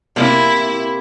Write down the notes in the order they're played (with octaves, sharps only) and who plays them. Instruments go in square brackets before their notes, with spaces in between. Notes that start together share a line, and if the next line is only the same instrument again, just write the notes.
[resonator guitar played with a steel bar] C3 A#3 [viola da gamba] E4